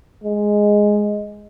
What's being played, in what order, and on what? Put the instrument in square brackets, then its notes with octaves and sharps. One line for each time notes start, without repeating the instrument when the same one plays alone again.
[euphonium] G#3